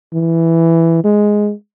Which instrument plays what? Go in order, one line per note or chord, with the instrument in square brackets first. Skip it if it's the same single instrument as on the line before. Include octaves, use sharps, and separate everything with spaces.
[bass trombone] E3
G#3